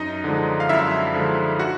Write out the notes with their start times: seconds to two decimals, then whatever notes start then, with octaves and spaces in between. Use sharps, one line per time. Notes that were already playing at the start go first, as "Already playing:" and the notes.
Already playing: F#2 D#4 D#5
0.24 D3 F3 G#3
0.60 F5
0.69 F#2 E4 E5
1.14 D3 F3 G#3
1.59 F#4 F#5